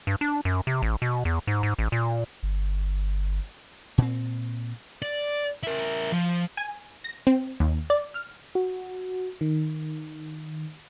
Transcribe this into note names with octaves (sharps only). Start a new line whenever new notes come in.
G2
D4
F#2
C3
A1
B2
E2
G#2
G#2
A1
A#2
G1
A#2 C4
D5
E4 A#4
F3
G#5
A#6
C4
D#2
D5
F6
F#4
D#3